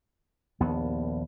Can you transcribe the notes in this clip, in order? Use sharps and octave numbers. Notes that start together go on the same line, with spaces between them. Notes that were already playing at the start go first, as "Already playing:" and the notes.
A#1 D#2 B3